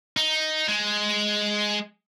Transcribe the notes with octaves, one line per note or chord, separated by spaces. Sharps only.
D#4
G#3